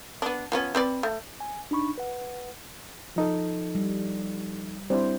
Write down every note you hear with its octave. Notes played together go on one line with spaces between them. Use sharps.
B3 D4
F3 B3 C#4
C4 B4 D5
A3
G#5
D4 D#4 B5 C#6
B4 F#5
F3 D#4 A4
G3
G3 C4 D4 E4 C5